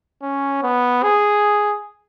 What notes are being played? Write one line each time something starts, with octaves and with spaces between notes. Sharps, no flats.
C#4
B3
G#4